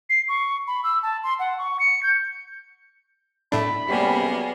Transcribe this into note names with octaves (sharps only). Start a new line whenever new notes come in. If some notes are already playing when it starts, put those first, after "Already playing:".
C7
C#6
B5
E6
A5
C6
F#5
C#6
C#7
G6
A2 A3 D4 B5
F#2 C3 G3 A#3 B3 G#4